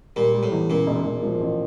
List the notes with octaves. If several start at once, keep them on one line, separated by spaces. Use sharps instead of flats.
A#2 G3
G3
A2
E2
A#2 C#3
E1
E1
F3
A1